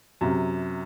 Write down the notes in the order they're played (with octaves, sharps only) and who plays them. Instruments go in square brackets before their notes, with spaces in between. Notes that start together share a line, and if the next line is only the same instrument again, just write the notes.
[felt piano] F#2 C3